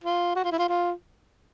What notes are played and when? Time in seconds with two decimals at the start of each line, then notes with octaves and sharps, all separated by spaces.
0.04 F4
0.36 F#4
0.44 F4
0.52 E4
0.59 F4
0.69 F4